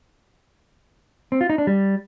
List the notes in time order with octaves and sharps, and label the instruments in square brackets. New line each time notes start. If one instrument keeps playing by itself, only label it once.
[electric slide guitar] C4
F4
D#4
D4
G3